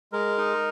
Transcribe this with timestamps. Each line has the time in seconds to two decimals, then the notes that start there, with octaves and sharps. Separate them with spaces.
0.13 G#3 A#4
0.38 D#4